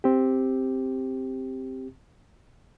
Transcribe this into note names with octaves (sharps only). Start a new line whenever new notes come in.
C4 G4